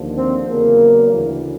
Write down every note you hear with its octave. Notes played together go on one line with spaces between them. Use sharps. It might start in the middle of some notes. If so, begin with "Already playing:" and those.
Already playing: D#2 D3 F3
C4
E2 C#3 F#3 A#3
D2 C#3 E3